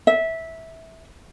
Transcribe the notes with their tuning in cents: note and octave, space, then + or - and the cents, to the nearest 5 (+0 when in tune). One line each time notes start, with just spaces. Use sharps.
E5 -15